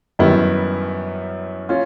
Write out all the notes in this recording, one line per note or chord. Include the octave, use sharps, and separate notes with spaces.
F#2 D#3 G3 B3 E4
C#4 F4